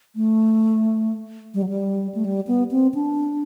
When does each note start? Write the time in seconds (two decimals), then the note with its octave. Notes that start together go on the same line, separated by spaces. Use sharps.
0.16 A3
1.54 G3
1.62 F#3
1.69 G3
2.15 A3
2.24 G3
2.47 B3
2.71 C4
2.94 D4